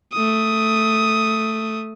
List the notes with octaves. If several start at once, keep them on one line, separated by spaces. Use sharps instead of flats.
A3 D#6